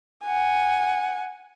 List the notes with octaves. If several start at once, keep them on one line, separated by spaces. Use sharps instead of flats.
F#5 G#5